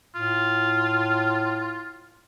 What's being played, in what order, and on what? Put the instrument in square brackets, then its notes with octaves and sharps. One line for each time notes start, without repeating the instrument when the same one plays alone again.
[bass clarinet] A2 [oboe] F4